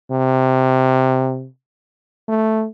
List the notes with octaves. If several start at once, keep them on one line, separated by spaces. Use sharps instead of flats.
C3
A3